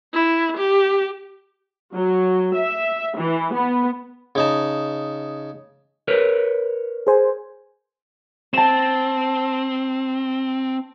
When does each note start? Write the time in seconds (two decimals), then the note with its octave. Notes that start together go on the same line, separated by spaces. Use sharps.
0.14 E4
0.57 G4
1.94 F#3
2.56 E5
3.17 E3
3.55 B3
4.35 C#3 D#4 A5
6.08 A#4 B4 C#5
7.07 G#4 C5 G#5
8.54 C4 A5 E7